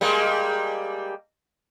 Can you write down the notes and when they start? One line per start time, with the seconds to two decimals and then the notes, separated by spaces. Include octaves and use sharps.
0.01 G3 G#3 A#3